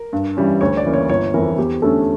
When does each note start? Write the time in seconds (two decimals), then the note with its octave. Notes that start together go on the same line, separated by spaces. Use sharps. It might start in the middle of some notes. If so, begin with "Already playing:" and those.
Already playing: A#4
0.13 G2
0.37 E3 G3 C#4
0.61 D2 C#5
0.77 D5
0.85 C#3 E3 A#3
0.94 C#5
1.09 G1 C#5
1.34 F2 E3 A#4
1.58 E2 G4
1.82 D3 A3 C#4 A4